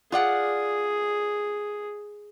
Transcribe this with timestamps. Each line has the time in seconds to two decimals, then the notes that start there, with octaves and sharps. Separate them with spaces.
0.12 F4 G#4 D5 F#5